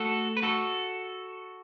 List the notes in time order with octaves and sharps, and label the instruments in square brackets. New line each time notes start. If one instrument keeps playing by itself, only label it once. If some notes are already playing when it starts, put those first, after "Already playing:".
Already playing: [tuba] A3 [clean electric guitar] F#4 A4
[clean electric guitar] B4
F#4 A4